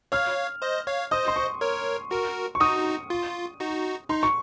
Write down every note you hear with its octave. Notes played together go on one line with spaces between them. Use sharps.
C#5 F5 F6
C5 D#5
C#5 F5
C5 D#5 D#6
C6
C#6
A#4 C#5
F#4 A#4
C#6
D#4 F#4 D#6
F4
D#4 F#4
D#4 C6
C#6